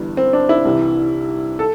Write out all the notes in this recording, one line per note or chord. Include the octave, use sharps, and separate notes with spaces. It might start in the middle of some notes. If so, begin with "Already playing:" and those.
Already playing: G1 G2 E3
C4
D4
E4
C2 C3 E3
A4